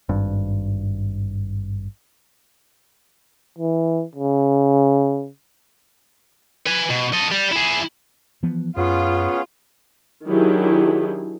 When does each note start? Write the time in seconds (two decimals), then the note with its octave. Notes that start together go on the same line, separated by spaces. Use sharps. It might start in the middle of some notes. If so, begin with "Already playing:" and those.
0.09 G#1 G2
3.58 E3
4.16 C#3
6.66 B4 G#5
6.90 B2
7.12 A4 D#5
7.31 G3
7.52 E4 G#4
8.43 E3 F3 B3
8.77 F#2 B3 C#4 F4 G#4
10.25 D#3 F#3 D4 E4 G4 G#4